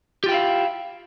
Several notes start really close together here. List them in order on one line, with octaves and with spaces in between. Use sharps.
G4 F4 G5 E4 F5